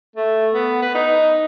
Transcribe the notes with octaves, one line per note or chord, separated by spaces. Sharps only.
A3
B3
B4
D#4